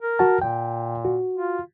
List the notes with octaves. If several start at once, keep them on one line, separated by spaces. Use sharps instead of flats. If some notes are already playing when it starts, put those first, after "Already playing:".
A#4
F#4 F#5 A5
A#2 G5
F#4
F4